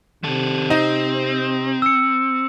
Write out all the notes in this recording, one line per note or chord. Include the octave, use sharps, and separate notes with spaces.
C3 D#3 A4
C4 D#4
E6 C#7